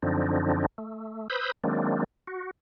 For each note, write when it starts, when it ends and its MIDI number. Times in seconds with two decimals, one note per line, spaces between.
0.02 0.66 42
0.02 0.66 50
0.02 0.66 53
0.02 0.66 60
0.02 0.66 62
0.02 0.66 63
0.78 1.28 57
1.30 1.52 71
1.30 1.52 72
1.30 1.52 83
1.30 1.52 87
1.30 1.52 88
1.30 1.52 91
1.64 2.04 51
1.64 2.04 54
1.64 2.04 56
1.64 2.04 58
1.64 2.04 60
1.64 2.04 62
2.27 2.51 66